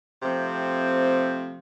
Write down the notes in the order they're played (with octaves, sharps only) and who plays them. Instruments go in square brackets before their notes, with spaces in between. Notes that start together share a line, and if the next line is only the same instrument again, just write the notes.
[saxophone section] C3 F3 A3 C4